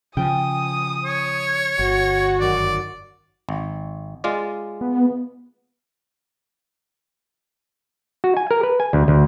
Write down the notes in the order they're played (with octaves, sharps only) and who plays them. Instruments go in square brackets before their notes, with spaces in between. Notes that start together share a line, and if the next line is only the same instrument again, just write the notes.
[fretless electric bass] C#3 F3 [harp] G5 G#5 [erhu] D#6
[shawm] C#5
[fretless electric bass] G1 [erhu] F#4
[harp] F#2 D#3 [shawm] D5
[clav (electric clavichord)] G#1
G#3 F4 D5
[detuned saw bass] B3
[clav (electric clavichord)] F#4
G#5
A#4
B4
G#5
D2
D2